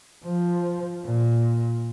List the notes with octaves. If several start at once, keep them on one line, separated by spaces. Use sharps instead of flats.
F3
A#2